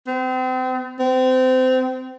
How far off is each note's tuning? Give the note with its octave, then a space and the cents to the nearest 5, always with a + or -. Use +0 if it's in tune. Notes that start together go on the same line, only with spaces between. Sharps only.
C4 -35
C4 -25